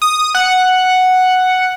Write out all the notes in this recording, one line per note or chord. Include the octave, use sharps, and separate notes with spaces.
D#6
F#5